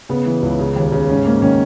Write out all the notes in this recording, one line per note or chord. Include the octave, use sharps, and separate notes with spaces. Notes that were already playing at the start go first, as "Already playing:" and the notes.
C#3 B3
E3
C#2
C#3
D#2
C#3
G#2 C#4
G#2 A#3
D#3 C#4